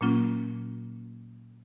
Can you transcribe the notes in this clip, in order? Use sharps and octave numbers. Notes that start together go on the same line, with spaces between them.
A#2 F#3 A#3 C#4 F4